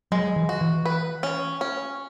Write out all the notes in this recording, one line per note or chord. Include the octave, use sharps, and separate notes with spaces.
F#3 G#3
E3
F#4
E3
B4
C#4
C#4